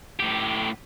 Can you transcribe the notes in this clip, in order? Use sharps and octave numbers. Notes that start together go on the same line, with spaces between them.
A2 G4